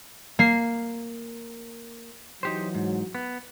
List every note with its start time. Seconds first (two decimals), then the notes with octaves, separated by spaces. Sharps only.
0.39 A#3 C7
2.43 E3 F#3 D#4 G4 C5
2.75 G#2
3.15 B3